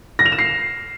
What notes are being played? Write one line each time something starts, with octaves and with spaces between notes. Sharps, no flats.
A#6
F7
E7
C7